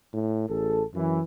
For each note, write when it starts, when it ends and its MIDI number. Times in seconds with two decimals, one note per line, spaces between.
0.13 0.47 45
0.49 0.83 33
0.49 0.82 68
0.49 0.82 69
0.94 1.19 42
0.94 1.20 52